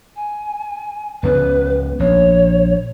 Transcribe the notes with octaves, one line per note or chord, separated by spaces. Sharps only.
G#5
C#2 C#3 B3 B4
A#1 C#5